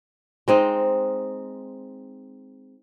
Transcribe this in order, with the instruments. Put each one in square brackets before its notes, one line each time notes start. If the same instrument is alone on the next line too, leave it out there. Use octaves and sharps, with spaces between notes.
[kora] G#3 C4 D#4